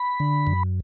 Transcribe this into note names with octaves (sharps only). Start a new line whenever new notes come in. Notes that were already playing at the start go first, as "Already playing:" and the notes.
Already playing: B5
D3
F#2